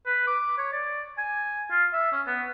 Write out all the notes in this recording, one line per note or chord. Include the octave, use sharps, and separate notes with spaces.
B4
D6
C#5
D5
G#5
F4
E5
C#4
B3